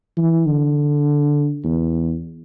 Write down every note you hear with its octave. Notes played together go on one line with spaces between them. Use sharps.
E3
D3
E2